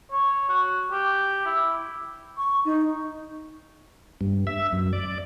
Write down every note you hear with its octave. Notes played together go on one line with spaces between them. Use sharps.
C#5
F#4
G4
E4
C#6
D#4
G2
E5
F#2
D5